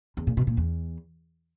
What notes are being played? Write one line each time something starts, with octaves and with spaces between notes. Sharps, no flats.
E2
A#2
B2
A#2
E2